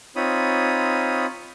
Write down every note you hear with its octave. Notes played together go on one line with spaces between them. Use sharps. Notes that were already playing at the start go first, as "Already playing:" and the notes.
C4 D#4 F4 C#5 B5 D#6